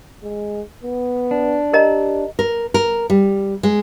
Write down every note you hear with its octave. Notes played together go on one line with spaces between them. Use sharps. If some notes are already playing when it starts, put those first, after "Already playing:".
G#3
B3
D4
G4 A#4 D#5 A#5
A#4
A#4
G3
G#3